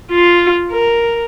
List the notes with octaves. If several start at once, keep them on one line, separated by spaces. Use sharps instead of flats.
F4
A#4